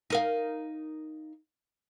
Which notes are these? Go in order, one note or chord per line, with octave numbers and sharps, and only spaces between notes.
D#4 A#4 F5